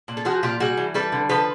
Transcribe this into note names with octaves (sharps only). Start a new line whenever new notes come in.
A#2
A4
F3 F#4 G#4
A#2 F4 G4
G3 F#4 G#4
E3
G3 A4 B4
D3
F3 A4 B4